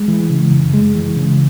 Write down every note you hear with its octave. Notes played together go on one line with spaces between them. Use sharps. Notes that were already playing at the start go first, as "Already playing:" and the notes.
Already playing: G#3
E3
C#3
F#2
G#3
E3
C#3